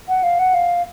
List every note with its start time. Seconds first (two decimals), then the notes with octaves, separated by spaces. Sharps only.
0.08 F#5
0.23 F5
0.39 F#5
0.54 F5